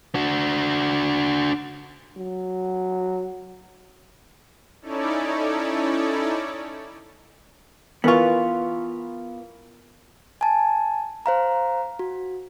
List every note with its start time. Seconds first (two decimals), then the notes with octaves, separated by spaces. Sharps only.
0.15 D4 F#4
2.17 F#3
4.82 C#4 D#4 E4 A4 C#5 D5
8.04 E3 B3 F4 A#4 C#6
10.41 G#5 A5
11.26 C5 F5 A#5
11.99 F#4